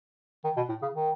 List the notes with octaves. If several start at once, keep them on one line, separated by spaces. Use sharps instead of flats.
D#3
B2
A2
C#3
D#3